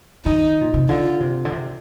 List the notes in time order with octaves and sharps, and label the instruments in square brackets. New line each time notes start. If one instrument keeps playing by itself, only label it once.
[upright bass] D#3 [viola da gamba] D#4
[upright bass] A#2
C3
[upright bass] D3 [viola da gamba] F4
[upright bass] C3
D3
C3